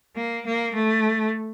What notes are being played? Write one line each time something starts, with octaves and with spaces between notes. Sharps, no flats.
A#3
A#3
A3